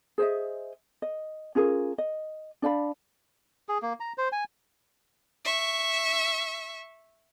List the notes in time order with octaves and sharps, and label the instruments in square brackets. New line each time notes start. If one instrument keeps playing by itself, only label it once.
[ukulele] G#4 C5 D#5 E5
D#5
C#4 F4 G#4 A#4
D#5
D4 D5 F5 B5
[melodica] G#4
A#3
A#5
C5
G#5
[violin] E5 C#6